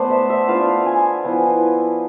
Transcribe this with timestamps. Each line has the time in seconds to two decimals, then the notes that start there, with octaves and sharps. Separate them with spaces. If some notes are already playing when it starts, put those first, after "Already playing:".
Already playing: A3 B3 C5 D5 A5
0.10 E5
0.30 E5
0.48 B3 D4 F4 F5
0.86 G#5
1.23 F3 B3 E4